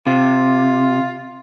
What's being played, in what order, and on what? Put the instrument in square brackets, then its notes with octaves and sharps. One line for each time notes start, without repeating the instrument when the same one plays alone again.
[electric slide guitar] C3 [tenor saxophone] F4